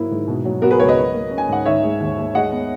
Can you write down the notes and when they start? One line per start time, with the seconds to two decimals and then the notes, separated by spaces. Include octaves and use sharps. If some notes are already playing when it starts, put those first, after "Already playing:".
Already playing: G#2 F#3 A#3 E4
0.11 G#2
0.28 B2
0.45 F#3
0.62 B3 F#4 A#4
0.71 G#4 B4
0.79 C#2 A#4 C#5
0.88 B4 D#5
0.97 F#3
1.14 A#3
1.31 C#4
1.38 G#5
1.48 G#2 F#5
1.65 D#3 C#5 E5
1.83 G#3
2.00 D#2
2.17 D#2
2.35 G#3 D#5 F#5
2.52 B3